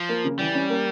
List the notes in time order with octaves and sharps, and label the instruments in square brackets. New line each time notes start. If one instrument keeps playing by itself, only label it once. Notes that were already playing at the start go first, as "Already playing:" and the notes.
Already playing: [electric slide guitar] F3
[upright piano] A#3
C#3
[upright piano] E3 [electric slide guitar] G3
[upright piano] C#4
A#3